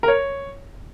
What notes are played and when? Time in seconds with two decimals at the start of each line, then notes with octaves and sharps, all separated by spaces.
0.03 A#4
0.08 C#5